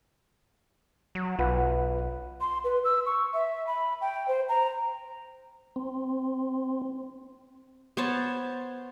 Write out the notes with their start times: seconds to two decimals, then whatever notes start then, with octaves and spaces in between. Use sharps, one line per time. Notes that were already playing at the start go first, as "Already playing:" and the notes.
1.15 F#3
1.39 B1 F4 B4 F#5
2.41 C6
2.64 B4
2.85 E6
3.06 C#6
3.34 E5
3.67 B5
4.01 G5
4.28 C5
4.49 A#5
5.76 C4
7.97 B3 C5 C#5 A5